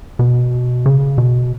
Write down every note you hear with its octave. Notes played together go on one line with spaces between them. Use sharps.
B2
C#3
B2